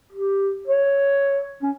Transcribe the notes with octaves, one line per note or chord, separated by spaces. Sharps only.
G4
C#5
C#4